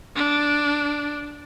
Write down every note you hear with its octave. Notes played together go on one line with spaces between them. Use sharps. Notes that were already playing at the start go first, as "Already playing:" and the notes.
D4